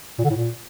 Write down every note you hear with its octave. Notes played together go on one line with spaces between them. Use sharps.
A#2
D3
A2
A#2